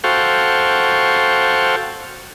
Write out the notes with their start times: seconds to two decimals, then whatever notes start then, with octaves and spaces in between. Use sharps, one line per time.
0.04 F#4 A4 C5 F5 G5 C#6